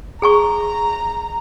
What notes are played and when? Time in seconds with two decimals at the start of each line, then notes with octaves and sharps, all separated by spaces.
0.22 G#4 G#5 A#5 C#6